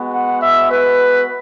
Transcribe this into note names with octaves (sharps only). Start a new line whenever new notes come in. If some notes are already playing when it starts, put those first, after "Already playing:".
Already playing: G#3 B3 F#4
F#5
E5
B4